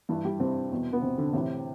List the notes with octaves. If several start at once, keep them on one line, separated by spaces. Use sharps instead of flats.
G2 E3
G3 G4
C3 C4
E2 B2
B3
C3 C4
D3 D4
A2 C3 E3 C4